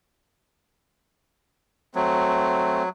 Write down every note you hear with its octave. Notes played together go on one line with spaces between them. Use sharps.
F#3 A3 C4